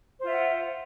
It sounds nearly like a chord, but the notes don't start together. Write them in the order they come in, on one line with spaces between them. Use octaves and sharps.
C5 F4 E5 F#5